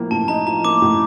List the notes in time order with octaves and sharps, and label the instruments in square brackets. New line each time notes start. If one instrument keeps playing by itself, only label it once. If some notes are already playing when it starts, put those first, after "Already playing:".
Already playing: [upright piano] A2 F3 A#3
[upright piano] A2 [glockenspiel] A5
[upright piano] D#4 [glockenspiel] A#5
[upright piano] F3 [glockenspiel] A#5
[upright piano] A#3 [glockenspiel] D6
[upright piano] A2